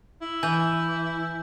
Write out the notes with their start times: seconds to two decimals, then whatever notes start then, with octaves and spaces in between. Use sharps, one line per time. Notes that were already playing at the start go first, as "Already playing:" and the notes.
0.22 E4
0.43 E3 G#5 G6